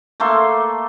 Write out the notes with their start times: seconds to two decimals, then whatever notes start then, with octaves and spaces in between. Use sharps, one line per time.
0.20 A3 A#3 A4 C6